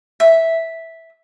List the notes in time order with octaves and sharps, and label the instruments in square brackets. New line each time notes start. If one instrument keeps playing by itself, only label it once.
[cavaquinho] E5